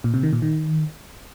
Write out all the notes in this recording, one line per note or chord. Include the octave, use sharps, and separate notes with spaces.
A#2
C3
D#3
A#2
D#3